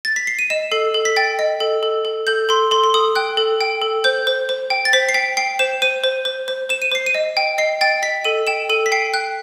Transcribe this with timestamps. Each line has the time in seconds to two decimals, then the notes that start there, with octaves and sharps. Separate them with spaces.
0.05 A6
0.16 B6
0.27 C7
0.39 D#7
0.50 D#5 E7
0.72 A4 C7
0.94 A4
1.05 B6
1.16 G5 A6
1.39 D#5
1.60 A4
1.83 A4
2.05 A4
2.27 A4 G6
2.49 A4 C6
2.71 A4 C6
2.84 C6
2.94 A4 D#6
3.15 G5 F#6
3.37 A4
3.61 G5
3.82 A4
4.04 C5 G6
4.27 C5
4.49 C5
4.70 G5
4.85 A6
4.93 C5 B6
5.09 C7
5.14 G5 B6
5.37 G5 C7
5.59 C5 E7
5.82 C5 D#7
6.04 C5
6.25 C5
6.48 C5
6.69 C5 E7
6.82 D#7
6.92 C5 C7
7.06 D#7
7.15 D#5
7.37 G5
7.58 D#5 C7
7.81 G5 A6
8.03 D#5 B6
8.25 A4 D#7
8.47 G5 E7
8.69 A4 D#7
8.86 B6
8.92 G5 C7
9.14 G5 F#6